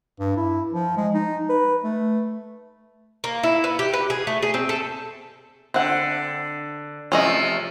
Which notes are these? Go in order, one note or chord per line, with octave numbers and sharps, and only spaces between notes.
G2
E4
F3
G#3
D#4
B4
A3
A#3
E4
B3
G4
B4
G#4
A3
G#4
C4
A4
D3 C4 F#5
C3 F3 A3 C#4 G#4 D#5